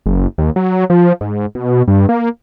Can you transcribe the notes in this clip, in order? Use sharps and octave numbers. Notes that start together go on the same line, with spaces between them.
F#1
D#2
F#3
F3
G#2
B2
G2
A#3